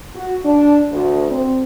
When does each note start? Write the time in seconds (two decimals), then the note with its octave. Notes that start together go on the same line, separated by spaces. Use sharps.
0.16 F#4
0.45 D4
0.92 D2
1.31 C4